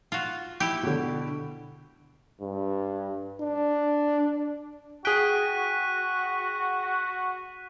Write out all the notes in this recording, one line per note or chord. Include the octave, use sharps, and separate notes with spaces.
F4 F#4
E4 G4
B2 D3
G2
D4
F#4 G#4 G5 F#6 B6 D#7